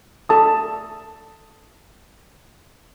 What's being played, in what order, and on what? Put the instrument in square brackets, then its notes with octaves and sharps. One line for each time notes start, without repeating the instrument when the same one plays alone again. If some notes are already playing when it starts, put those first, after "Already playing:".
[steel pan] A4 A5 D#6